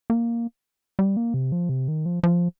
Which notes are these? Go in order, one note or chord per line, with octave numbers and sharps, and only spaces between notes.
A#3
G3
A#3
C3
F3
C3
D#3
F3
F3